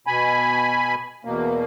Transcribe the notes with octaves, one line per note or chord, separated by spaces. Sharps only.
B2 G#5 B5
E2 B2 A#3